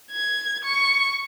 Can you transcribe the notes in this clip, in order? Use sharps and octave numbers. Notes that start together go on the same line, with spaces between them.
G#6
C#6